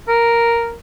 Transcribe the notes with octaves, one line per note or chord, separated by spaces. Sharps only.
A#4